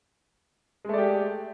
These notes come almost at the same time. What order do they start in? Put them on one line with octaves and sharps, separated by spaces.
G#3 A3 D5 G4